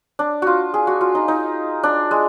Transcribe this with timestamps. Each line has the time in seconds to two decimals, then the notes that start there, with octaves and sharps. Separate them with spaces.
0.19 D4
0.42 F4 F#4
0.74 G#4
0.87 F#4
1.01 F4
1.15 D#4
1.28 D#4
1.83 D4
2.11 G#3